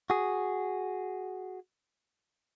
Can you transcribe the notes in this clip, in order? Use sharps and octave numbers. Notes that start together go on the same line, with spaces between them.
F#4 G#4